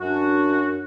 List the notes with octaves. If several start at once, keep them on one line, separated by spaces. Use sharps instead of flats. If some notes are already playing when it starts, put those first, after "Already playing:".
F#2 D4 F#4